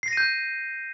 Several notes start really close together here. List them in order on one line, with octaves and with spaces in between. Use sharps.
C7 A#6 D#7 G6